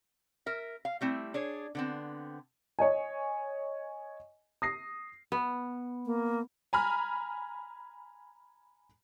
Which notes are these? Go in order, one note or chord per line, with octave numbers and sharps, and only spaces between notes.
A#4 E5
F5
G3 A3 C4 E4
D4 G#4 C#5
D3 B3 C4
C#5 D#5 G#5
D#6 A#6 C7
B3
A#3
G#5 A#5 B5 F6